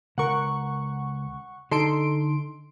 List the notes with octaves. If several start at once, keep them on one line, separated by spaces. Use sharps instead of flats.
C#2 A#4 F#5 C#6
D3 D#4 A4 C6 D7